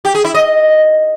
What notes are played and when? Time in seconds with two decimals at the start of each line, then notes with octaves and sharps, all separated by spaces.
0.05 G4
0.15 G#4
0.25 E4
0.34 D#5